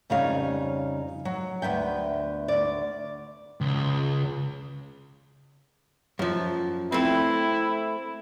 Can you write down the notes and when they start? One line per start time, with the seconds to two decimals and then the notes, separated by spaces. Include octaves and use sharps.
0.10 F2 C#3 G3 D#4 C#5 F5
1.25 F#3
1.62 D2 B3 E5 G5
2.48 D2 D5
3.61 C#2
6.19 F#2 F3
6.92 A3 C4 E4